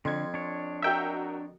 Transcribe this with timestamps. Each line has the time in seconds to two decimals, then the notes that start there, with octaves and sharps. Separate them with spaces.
0.05 F2 D3 C6 G#6
0.34 D4 C#5
0.82 F#4 A#4 D#5 E5 G5